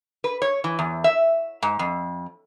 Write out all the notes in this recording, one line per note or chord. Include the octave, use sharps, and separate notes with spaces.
B4
C#5
E3
E2
E5
G#2
F2